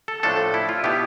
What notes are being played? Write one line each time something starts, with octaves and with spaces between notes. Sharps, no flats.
A4
A2 F3 A3 D4 A4
E4
F4
B2 B3 E4 G4